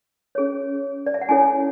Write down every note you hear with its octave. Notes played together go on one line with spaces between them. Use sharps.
C#4 G#4 C#5
D5
E5
F#5
C#4 E4 A4 C#5 G#5